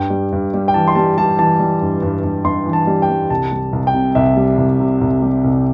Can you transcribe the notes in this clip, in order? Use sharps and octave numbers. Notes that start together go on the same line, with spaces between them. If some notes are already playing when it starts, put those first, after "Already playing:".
Already playing: G2 G5
G3
G2
G3
G5
E3 A5
C6
G3 A5
G3 A5
E3 A5
G3
G2
G2
G2
G2 C6
E3
A5
G3
G5
G3
C2 A5
G3
C2
G5
C3
C2 E5
G3
C2
C3
C2
G3
C2